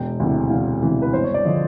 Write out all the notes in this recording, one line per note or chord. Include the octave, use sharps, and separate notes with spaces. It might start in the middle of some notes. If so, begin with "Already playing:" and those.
Already playing: E1 G5
D2 C3 E3
E1 F5
D2 C3 E3
B4
G1 C5
C#5
D5
D3 F3 D#5